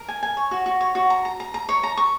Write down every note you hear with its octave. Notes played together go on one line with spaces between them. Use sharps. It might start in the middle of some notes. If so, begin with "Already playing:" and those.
Already playing: A#4
G#5
G#5
C#5
F#4
F#4
C#5
F#4
A#5
A#5
A#5
A#5
C#5
A#5
C#6